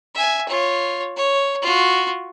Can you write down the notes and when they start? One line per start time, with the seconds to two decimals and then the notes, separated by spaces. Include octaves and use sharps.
0.15 E5 G#5
0.48 F4 C#5
1.17 C#5
1.62 F4 F#4